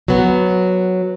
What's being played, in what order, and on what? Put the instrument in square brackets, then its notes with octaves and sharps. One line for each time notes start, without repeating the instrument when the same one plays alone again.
[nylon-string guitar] F#3 B3